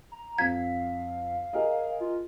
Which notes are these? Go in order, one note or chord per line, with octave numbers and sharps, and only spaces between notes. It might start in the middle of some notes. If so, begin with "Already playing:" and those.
A#5
F2 F5 G#6 B6
G#4 A#4 D#5
F4